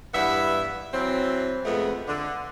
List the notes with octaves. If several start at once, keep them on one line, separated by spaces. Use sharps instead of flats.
E2 G2 B3 E4 E5
E3 F#3 C4
F2 G#3 A3 B3
D3